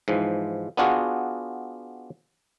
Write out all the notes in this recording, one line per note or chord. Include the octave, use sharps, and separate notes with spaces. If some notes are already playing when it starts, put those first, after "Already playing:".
G#2 E3 F3
B3 D4 F4 F#4 G#4